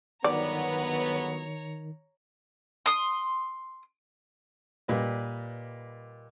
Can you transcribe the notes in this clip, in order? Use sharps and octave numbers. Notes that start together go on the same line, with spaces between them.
G1 D#3 F#3 B3 C#5 D5 A#5
C6 D#6
A#2 G3 B4 D#5